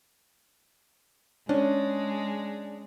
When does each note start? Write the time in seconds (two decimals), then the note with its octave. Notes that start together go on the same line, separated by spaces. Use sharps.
1.49 G#3 C#4 D4